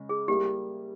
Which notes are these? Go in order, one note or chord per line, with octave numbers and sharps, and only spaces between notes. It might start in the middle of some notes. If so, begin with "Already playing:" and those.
Already playing: C#3 G#3
G#4
G3 A#3 E4 G4